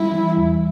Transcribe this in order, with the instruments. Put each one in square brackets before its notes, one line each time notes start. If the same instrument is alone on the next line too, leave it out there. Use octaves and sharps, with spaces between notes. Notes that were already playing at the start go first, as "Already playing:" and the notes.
Already playing: [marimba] G3 [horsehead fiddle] E4
[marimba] E3
E2